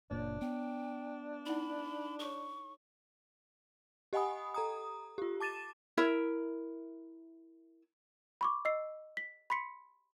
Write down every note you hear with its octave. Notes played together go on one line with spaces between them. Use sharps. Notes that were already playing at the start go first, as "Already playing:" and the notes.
F#1 A#2 D4 C5 C#5
B3 G5
D#4 E4 F#5 B5
A4 C#5 C#6
G4 D#5 F#5 G#5 B5 D#6
A4 A#5 D#6
F4 G4
A5 D6 A6 D#7 E7
E4 A#4 E5
B5 C#6 D6
D#5 E6 C7
B6
B5 C6 B6 C#7